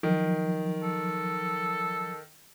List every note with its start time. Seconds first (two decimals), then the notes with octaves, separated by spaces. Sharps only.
0.03 D#3 F3 F#3
0.83 A4